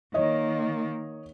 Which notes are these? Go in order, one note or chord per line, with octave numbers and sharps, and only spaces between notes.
D#3 A#3 C#5 D#5